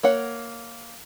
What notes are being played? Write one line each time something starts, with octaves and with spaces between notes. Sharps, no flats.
A#3 C#5 F#5